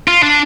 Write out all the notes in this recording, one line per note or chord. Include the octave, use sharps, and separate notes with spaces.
F4
D4